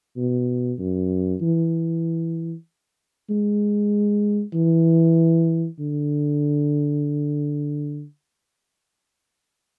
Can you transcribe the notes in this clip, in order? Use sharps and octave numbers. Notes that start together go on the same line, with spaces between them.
B2
F#2
E3
G#3
E3
D3